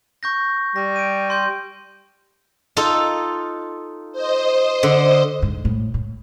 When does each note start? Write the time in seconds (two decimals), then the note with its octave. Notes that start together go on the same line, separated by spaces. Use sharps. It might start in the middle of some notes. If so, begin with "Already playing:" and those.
0.23 C#6 G6 A#6
0.76 G3 A#6
0.96 D7 D#7
1.30 C6 G6
2.77 D#4 F4 A4
4.12 C5 D#5
4.83 D3
5.42 G#2
5.65 A2
5.94 A2